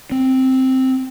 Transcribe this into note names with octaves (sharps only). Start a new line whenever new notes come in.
C4